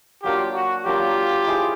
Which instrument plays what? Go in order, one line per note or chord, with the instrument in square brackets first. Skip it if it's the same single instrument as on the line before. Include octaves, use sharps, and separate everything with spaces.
[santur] F#3 A#3 D4 [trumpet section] F4 G4
[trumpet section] F#4
[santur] F#3 A#3 D4 [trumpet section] F4 G4
[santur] E4 G#4 C5 E5